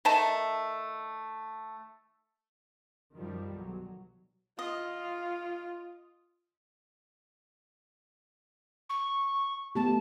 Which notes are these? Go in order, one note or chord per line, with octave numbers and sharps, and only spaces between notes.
D#3 A3 A5
F#2 D#3 F3 G3
B1 F#3
F4 D#5
C#6
A3 B3 G4 A5